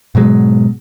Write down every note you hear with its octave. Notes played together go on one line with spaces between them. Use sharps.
G#2 B2 F#3 G#3